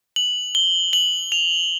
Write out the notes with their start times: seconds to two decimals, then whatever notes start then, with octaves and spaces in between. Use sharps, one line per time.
0.16 F#7
0.55 G7
0.93 F#7
1.32 F7